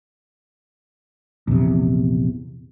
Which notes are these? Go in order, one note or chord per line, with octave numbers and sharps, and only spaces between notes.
A#1 E2 C3